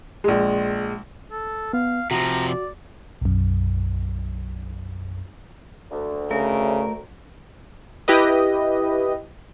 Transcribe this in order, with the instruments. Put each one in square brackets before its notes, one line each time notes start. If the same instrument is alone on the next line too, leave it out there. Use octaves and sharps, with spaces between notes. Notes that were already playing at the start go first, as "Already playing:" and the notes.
[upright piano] A#1 G#3
[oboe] A4
[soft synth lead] B3 [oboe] F5
[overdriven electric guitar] C3 F3 [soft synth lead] F#4 [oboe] A#5
[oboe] D5
[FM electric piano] B1 F#2
[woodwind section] D2
[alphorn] C#3 [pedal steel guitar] A3 A#4
[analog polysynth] E4 G4 B4 D#5